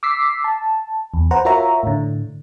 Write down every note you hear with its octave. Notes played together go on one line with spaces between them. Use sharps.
D6 E6 B6 C7
A5
E2
B4 C5 F#5 A#5
F4 F#4 A#4 C#5 E5 A#5
A2 D3